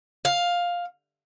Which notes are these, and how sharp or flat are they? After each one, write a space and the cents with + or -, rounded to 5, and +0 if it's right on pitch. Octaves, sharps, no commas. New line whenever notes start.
F5 +10